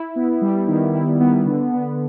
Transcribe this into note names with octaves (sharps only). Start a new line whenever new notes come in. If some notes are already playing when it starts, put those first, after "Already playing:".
Already playing: E4
B3
G3
D#3
E4
B3
D3
B3